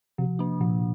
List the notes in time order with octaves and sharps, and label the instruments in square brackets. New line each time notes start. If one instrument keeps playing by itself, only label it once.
[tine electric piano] C3 [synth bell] F3
[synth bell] A#3 D4
[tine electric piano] A#2 [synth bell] F3